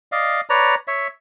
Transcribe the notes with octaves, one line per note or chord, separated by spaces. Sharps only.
D5 D#5 F5
B4 C#5 D5 A#5
C#5 E5